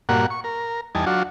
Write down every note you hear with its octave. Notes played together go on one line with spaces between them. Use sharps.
G2 A#2 A#3 F#4 F#5
C#6
A#4
E2 G3 D#4 G#5 A5
F#3 D4 F4 F#4